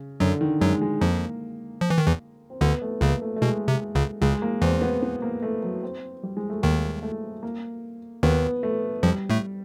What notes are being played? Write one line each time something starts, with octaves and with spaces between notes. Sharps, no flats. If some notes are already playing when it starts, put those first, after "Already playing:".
Already playing: C#3
F#2 D3 F#3
D#3
F#2 F#3 G#3
G#3
F2 F3 A#3
F3
E3
D#3
E2 E3
C4
D2 D3 B3
A3
C#2 C#3 A#3
A3
A3
B2 G#3
C3
C#2 C#3
C#2 C#3 G#3
A#3
E2 E3 C4
B3
B3
A#3
A3
F#3
C4
G3
G#3
A3
D#2 D#3 A#3
A3
A#3
D#2 D#3 B3
A3
F2 F3 G3
A2 A3